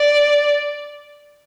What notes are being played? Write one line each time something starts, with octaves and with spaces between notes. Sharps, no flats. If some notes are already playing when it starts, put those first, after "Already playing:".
Already playing: D5